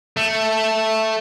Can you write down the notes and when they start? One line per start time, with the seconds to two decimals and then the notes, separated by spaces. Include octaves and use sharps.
0.17 A3